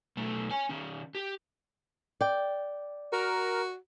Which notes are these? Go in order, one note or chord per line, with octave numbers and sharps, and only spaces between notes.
B1 A3
C#5 G#5
D#3 C#4
G4
D5 G5
F#4 A#4